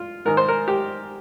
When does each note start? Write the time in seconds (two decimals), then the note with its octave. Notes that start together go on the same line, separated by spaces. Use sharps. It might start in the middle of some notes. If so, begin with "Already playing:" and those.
Already playing: F4
0.25 G#2 D#3 A#4
0.37 C5
0.48 A#4
0.68 G4